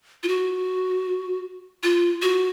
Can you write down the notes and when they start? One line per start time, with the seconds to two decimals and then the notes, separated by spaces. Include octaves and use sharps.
0.23 F4
0.28 F#4
1.83 F4
2.22 F#4